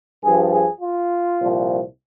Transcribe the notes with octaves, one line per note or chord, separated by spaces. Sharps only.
G2 F3 G#4
G#4
F4
C2 A#2 F3